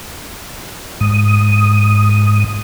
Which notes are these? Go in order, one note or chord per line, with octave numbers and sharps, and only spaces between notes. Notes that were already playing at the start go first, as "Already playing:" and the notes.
G#2 D#6